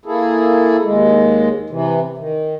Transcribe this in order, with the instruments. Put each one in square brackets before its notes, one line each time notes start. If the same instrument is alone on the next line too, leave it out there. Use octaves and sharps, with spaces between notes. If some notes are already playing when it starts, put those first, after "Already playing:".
[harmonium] A#3 E4 G#4 A4
D#2 G#3
C3 E3
D#3